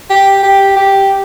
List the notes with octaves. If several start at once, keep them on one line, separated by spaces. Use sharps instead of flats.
G4
G4
G4